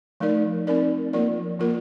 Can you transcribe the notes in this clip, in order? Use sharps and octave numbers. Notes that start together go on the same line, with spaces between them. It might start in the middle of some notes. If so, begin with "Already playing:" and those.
F3 A3 D#4 A#4 D5
C4 D#4 A#4 D5
F3 A#3 F4 A#4 D5
F3 A#3 F4 A#4